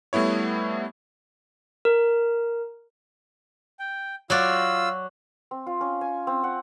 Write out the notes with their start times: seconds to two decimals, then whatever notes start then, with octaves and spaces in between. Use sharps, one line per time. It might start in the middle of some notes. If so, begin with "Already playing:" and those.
0.13 G3 A3 B3 E4 C#5
1.85 A#4
3.79 G5
4.30 F#3 F4 F#4 D5 E6
5.51 C4
5.66 F4
5.81 C#4
6.01 G#5
6.27 C4
6.44 F#5